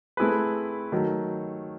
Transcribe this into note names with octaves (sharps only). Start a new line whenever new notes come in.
A3 C4 E4 G#4 B4
D#3 F#3 A3